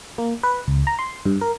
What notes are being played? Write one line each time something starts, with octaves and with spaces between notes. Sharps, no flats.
A#3
B4
C#2
A#5
C6
G2
A#4